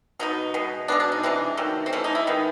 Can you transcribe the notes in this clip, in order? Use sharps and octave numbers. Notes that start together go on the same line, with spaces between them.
B2 F#3 B3 D#4
B2 G#3 B3
B2 G#3 B3 D4
D4
D#4
C3 E3 G#3 D4
D#3 F#3 A3
C4
E3 A3 C#4
D#4
E4
D#3 G#3 B3